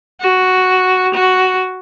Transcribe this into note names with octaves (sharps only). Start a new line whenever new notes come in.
F#4
F#4